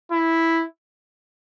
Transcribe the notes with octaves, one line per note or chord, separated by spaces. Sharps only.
E4